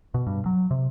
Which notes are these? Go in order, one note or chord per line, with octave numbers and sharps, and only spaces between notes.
B2
G2
F#3
C3